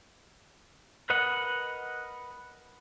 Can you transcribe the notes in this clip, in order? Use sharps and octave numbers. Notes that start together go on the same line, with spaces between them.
A#4 B4 D#5 F#5